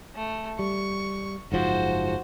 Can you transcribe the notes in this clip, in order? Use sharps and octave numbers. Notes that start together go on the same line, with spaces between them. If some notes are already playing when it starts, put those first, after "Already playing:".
A3
G3 C#6
F#1 G#2 F3 F#4 C5